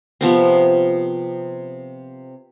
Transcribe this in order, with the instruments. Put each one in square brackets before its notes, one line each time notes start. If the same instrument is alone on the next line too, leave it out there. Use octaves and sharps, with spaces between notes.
[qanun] C3 F3 B3 C4